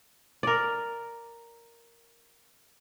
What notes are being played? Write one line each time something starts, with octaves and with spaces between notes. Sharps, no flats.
A#4 D5